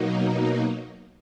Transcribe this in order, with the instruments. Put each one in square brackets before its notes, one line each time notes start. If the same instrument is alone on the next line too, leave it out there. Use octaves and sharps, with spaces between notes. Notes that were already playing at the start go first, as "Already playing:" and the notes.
Already playing: [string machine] B2 F#3 A#3 D#4